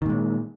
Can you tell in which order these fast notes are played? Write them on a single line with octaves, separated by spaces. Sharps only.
D#3 A#2 G#3